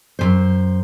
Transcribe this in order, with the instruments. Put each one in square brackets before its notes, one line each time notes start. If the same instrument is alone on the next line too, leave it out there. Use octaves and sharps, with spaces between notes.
[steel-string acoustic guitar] F#2 C3 C5